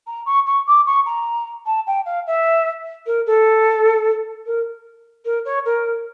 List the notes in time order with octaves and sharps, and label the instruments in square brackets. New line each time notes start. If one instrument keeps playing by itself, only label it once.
[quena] A#5
C#6
C#6
D6
C#6
A#5
A5
G5
F5
E5
A#4
A4
A#4
A#4
C#5
A#4